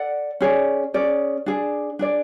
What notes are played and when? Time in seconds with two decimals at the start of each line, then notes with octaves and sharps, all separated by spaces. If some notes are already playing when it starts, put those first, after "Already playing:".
Already playing: A4 D5 F#5
0.41 C#4 G#4 D5
0.94 C#4 G#4 D5
1.46 D4 G#4 D5
1.99 D4 G#4 D5